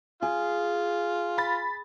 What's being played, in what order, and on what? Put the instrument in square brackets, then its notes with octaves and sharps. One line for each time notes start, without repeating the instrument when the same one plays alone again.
[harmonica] F4 [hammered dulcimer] G#4
[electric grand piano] B5 A6